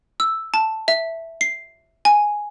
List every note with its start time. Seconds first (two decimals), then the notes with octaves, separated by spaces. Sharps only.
0.20 E6
0.54 A5
0.88 E5
1.41 C7
2.05 G#5